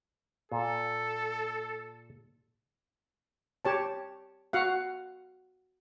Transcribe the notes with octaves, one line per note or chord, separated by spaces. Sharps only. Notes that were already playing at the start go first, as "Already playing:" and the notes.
A#2 A4
G4 C#5 A5
F#4 F5 F#5